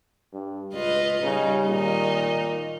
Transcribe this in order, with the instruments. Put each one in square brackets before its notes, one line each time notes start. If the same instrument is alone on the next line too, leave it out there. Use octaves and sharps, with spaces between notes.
[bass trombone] G2
[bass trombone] C#2 [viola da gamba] F4 B4 D#5
[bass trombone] C#3 [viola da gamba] G3 D#4
[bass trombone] A#2 [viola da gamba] D#3 D#4 D#5